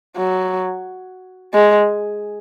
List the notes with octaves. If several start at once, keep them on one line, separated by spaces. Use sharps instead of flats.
F#3
G#3